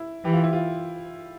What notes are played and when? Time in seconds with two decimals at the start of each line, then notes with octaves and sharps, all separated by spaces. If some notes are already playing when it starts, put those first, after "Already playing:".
Already playing: E4
0.24 E3 G4
0.33 F4
0.43 E4
0.53 F4